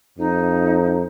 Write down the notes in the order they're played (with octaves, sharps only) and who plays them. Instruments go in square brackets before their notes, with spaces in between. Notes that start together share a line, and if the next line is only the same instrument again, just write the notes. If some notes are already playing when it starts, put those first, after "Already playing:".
[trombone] F2 [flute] D#4